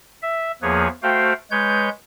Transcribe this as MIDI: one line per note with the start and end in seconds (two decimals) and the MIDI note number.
0.22 0.51 76
0.62 0.88 40
0.62 0.88 53
0.62 0.88 58
0.62 0.88 68
0.62 0.88 71
0.62 0.88 73
1.03 1.33 57
1.03 1.33 66
1.03 1.33 72
1.03 1.33 77
1.03 1.33 79
1.51 1.89 56
1.51 1.89 71
1.51 1.89 73
1.51 1.89 91